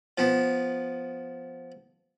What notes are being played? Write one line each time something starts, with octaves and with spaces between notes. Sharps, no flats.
F3 B3